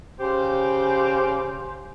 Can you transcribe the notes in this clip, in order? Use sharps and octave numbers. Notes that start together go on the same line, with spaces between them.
C#3 G4 C5